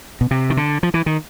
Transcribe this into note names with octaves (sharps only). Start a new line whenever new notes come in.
B2
C3
D#3
D3
F3
E3
D#3